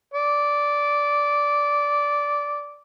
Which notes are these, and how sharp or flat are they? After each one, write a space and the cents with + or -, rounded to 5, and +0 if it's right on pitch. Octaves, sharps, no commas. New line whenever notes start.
D5 -10